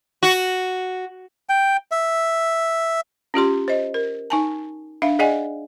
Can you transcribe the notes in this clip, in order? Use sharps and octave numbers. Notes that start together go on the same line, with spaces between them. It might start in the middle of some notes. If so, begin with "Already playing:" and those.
F#4
G5
E5
C#4 F4 G4 C6
C5 D#5
A#4
D#4 G#5 A5
D4 E5 F5
G#4 D5 D#5 F#5 G#5